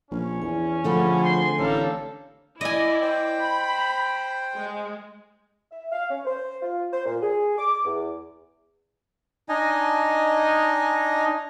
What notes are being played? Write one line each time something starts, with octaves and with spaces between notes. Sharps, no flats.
A#1 C#4
E2 G#5
D3 F3 A3 C4 G#4 F#5 B5
C5 G#5 C6
A1 G3 A#3 A4 C#5 F5
E4 D5 D#5 G#5
C5 G5
B5
G#3
E5
F5
C#4
C5
F4
C5
A#2
G#4
D6
E2
D4 D#4 D#5 G#5